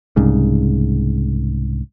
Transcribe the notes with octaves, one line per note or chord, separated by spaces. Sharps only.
C2 G#2 C#3